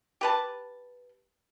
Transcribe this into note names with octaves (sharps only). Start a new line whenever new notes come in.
G4 B4 A5